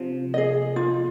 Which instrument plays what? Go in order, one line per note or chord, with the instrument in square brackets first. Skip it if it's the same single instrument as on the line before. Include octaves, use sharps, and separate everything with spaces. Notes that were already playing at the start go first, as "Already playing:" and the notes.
Already playing: [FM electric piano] C3 F3
[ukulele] G#4 D#5
F4